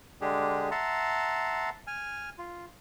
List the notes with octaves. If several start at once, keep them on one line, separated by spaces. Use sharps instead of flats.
D3 G#3 D4 G4 G#4
E5 F#5 A5 A#5 C6
G#5 F6
F4